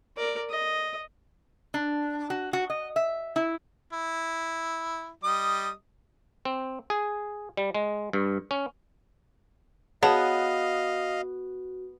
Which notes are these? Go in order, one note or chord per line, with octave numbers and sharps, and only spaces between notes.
A#4 D5
D#5
D4
F#4
F#4
D#5
E5
E4
E4
G3 D#5 D#6
C4
G#4
G3
G#3
G2
C#4
B3 F#4 G#4 C#5 D#5 F5 A5